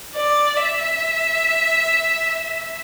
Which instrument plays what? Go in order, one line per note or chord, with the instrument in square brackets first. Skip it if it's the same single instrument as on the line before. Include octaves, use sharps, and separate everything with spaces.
[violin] D5
E5